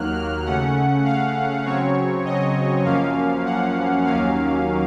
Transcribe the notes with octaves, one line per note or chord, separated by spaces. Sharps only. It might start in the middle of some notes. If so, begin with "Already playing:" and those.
Already playing: D#2 D#3 F#3 A#3 F6 F#6
F6
C#3 A3 C#4 F#5
F5
C#3 F#3 C4 C#5
D#5
F#2 F3 A#3 C#4 F5
F#5
D#2 D#3 F#3 A#3 C#4 F5